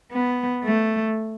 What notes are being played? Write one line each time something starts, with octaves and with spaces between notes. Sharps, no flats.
B3
A3